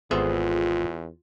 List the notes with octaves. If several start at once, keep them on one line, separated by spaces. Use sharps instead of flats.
G#1 E2 B3 F4 G#4 A4 C5 E5